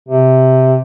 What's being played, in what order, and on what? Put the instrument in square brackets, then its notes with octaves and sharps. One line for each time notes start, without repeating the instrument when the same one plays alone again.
[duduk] C3